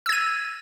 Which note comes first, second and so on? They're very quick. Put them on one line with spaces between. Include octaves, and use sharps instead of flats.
E6 G#6 D#7